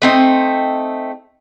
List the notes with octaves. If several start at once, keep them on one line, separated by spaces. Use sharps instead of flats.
A3 C4 D#4